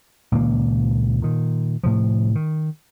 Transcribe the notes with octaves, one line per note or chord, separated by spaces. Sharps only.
C#2 A#2 D#3 A#3
A#2 D#3
A2 C3 F3
D#3